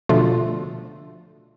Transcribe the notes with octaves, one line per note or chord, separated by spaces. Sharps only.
B2 D3 F3 A3 D4 F4